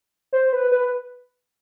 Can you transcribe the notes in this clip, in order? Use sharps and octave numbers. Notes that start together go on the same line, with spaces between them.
C5
B4
B4